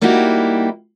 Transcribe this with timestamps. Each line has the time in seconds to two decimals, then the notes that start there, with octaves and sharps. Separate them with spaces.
0.01 G3 A#3 D#4 E4 F#4 G4